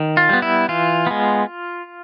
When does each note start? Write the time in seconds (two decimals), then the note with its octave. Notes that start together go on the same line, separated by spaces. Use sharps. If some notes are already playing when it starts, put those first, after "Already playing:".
Already playing: D#3
0.17 F4
0.29 G3 B3
0.42 E4
0.69 E3 F4
1.07 G#3 B3